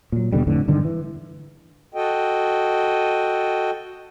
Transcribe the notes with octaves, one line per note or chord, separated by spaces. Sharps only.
A#2 F#3
D#2 B2 D3 G3
F2 A2 D3 E3
G2 D3 D#3 G#3
E3
F#4 A4 D#5 G5